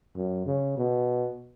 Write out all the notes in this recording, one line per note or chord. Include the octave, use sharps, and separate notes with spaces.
F#2
C#3
B2